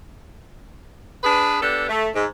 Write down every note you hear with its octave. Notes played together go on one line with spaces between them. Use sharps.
D4 G#4 B4
B3 D4 G4 A4
A3
G#2